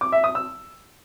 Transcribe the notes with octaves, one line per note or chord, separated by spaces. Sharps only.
D6
E5
D#6
E6